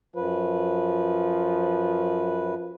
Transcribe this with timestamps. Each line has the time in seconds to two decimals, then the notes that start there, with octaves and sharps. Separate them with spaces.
0.16 F#2 F3 B4